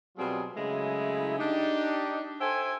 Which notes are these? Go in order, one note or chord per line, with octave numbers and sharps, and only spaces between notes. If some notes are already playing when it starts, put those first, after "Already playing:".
B2 F#3 G3 C4 F4 G#4
C#3 F#3 G#3 A3 E4
D4 D#4 G4
A4 C5 E5 G5 G#5